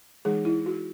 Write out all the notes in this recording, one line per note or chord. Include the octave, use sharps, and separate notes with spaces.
E3 G#3 D#4 G#4
E4
F#4